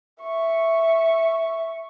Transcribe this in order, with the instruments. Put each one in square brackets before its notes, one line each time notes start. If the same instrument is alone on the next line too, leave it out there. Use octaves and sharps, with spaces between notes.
[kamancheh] E5 C#6